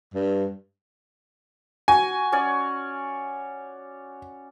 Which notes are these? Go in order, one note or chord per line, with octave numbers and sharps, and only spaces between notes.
G2
F#4 G#5
C#4 C#5 D5